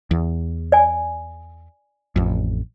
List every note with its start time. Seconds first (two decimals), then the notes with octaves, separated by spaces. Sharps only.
0.11 E2
0.72 D5 G#5
2.16 A1 F2